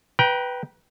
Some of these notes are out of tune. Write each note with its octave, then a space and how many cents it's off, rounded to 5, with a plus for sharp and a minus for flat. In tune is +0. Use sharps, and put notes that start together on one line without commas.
B4 +0 G5 -10 A#5 +35